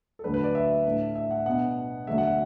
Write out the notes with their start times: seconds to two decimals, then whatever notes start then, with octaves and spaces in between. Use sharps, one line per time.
0.19 A4
0.24 D2 D3 F#3 D4 B4
0.34 B4
0.44 D5
0.55 E5
0.85 A2 A3 D4
1.15 E5
1.31 F#5
1.46 B2 B3 D4 F#5
2.07 D2 D3 F#3 D4 E5
2.18 F#5